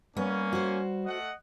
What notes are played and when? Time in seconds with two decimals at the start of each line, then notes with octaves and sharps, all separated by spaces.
0.17 G3 A#3 B3 C#4
0.53 F#4 C5
1.06 A3 D#5 F#5